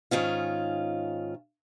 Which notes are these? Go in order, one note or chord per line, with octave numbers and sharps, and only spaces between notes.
G#2 D#3 C#4 F4